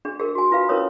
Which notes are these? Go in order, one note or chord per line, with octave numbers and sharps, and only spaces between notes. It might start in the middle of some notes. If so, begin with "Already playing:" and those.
D4 G#4
G#4 A#4
F#4 G#5
F4 B4 F5
C#4 E4 A#4 B4 C#5 D#6